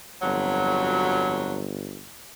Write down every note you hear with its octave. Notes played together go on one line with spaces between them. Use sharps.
G1 F2 F#3